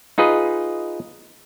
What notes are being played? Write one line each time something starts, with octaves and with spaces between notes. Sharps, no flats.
D#4 F4 G#4 B4 D#5